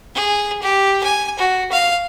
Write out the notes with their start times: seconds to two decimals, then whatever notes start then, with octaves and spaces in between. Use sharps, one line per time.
0.15 G#4
0.62 G4
1.03 G#5
1.39 F#4
1.72 F5